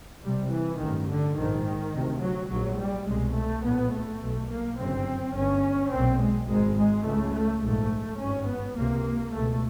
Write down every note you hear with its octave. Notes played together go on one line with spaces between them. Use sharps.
C2 C3 G3
E3
A1 G2 D#3
D3
A#1 G#2 D#3
D2 C3
F#3
A#1 G#2 F#3
G3
C2 B2 G#3
A3
A#1 A2 B3
A3
B1 B2
A#3
G1 F#2 C#3 C4
G1 G2 C#4
B1 A#2 C4
G#3
G#1 G#2 G#3
G#3
C#2 C#3 A3
A3
A#1 G#2 A3
G#1 G2 C#4
B3
C#2 C3 A#3
C#2 B2 A3